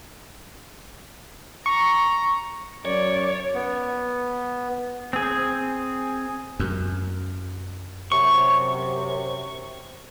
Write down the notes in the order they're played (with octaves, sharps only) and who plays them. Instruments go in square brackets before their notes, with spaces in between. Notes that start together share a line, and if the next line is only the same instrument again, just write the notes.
[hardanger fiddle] A#5 [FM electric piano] C#6
[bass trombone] F#2 [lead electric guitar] C#5 [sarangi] D5
[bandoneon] B3
[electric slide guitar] C4 G#4
[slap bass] F#2
[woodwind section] F#2 C3 [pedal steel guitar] C#6